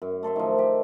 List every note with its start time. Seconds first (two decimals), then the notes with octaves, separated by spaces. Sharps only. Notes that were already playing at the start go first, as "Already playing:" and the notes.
0.02 F#2
0.23 A3 A4 C5 E5
0.36 D#3 F3
0.58 G4